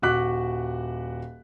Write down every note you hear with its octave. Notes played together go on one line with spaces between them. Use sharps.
D#1 F#4 D6 F#6 B6